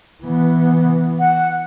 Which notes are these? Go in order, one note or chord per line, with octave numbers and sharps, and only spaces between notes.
E3 B3
F#5